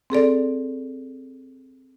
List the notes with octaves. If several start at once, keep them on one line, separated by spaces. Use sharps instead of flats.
C4 G#4 A4 D5